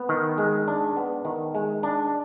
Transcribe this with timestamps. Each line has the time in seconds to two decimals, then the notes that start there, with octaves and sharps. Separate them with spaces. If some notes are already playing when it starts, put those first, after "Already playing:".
Already playing: B3
0.09 D#3
0.38 G#3
0.68 D4
0.97 B3
1.25 D#3
1.55 G#3
1.83 D4